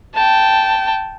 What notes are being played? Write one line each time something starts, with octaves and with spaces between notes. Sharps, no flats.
G5 A5